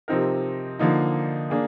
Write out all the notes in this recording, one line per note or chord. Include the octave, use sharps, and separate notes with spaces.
C3 F3 C4 D#4 A#4
D3 F3 A#3 D#4
A#3 D4 G#4